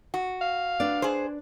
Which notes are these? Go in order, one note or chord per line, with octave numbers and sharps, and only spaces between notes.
F#4
F5
D4 B4 D5
G#4 C5